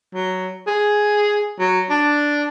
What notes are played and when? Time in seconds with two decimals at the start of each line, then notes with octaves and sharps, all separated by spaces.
0.14 F#3
0.67 G#4
1.60 F#3
1.90 D4